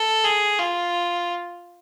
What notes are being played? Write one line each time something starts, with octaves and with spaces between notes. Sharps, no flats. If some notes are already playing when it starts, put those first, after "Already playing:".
Already playing: A4
G#4
F4